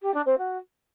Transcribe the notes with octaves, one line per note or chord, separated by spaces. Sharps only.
G4
D4
C4
F#4